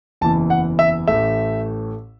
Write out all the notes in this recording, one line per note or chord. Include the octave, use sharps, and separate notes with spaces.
F#1 E2 E3 A5
F#5
E5
A1 A2 A3 E5